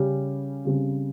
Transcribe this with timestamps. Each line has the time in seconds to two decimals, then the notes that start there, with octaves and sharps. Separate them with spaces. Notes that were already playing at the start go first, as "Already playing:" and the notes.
Already playing: C#3 G3 C#4 G4
0.65 C#3 G3 C4